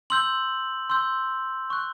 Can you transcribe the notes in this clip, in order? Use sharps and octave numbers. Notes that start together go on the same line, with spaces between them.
C6 E6 G6 F#7
C6 E6 G6
C#6 F#6